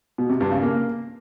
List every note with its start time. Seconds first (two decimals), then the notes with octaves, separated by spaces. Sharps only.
0.18 B2
0.29 C3
0.41 G2
0.52 C#3
0.63 A#3